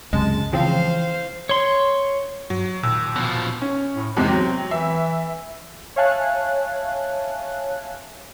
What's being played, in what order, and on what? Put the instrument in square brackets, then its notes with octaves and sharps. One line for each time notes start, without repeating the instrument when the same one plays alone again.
[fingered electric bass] C#2 F#2 C3 [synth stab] G#3 [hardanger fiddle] A5
[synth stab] C#3 F3 C4 [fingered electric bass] E3 [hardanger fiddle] C5 F5
[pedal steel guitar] C#5 C6
[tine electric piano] G2 [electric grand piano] F#3
[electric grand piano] D#2 [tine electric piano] A#2 E6
[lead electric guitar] B2 F3
[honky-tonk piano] C#4
[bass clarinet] A2
[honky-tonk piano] E2 G#2 C3 [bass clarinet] C4
[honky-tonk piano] F#3 [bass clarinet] C4
[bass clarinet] E3 [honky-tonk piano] E5
[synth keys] C#5 E5 F5 G#5 A5 F#6